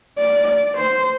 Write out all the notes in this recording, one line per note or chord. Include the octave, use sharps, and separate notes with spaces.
D5
D5
C5